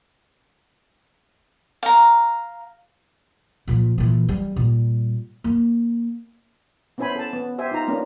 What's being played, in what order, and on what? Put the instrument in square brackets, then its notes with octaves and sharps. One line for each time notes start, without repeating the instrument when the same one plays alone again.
[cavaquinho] F5 A#5
[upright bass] A#2 F3
A#2 E3
G3
A#2 G3
A#3
[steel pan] B3 C#4 E4 C5 G#5 B5
A4 A5
B3
G4 C5 E5 G#5
D#4 F4 A#5
A#3 B3 C#4 D4